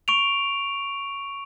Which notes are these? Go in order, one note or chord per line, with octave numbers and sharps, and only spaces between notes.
C#6 D7 F7